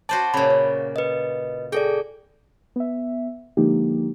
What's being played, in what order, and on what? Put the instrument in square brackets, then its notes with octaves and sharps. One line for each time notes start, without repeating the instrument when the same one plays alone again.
[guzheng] F#4 C5 D5 [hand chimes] A5
[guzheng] A#2 C#3 [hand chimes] B5
[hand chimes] C#5
B4 D#5
[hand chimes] G#4 A4 D5 [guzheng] G5
[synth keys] B3 E5
D3 F3 G#3 A#3 D#4 G4